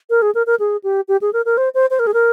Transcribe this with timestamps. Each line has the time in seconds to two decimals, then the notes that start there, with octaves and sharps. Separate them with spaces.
0.10 A#4
0.22 G#4
0.35 A#4
0.47 A#4
0.59 G#4
0.83 G4
1.08 G4
1.21 G#4
1.33 A#4
1.45 A#4
1.57 C5
1.74 C5
1.90 C5
1.99 A#4
2.07 G#4
2.14 A#4